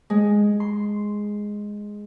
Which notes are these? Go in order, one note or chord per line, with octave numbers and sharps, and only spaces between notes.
G#3
C6